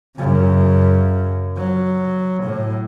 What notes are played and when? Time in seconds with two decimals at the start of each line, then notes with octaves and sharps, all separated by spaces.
0.17 F#2 C#3
1.57 F#3
2.43 A2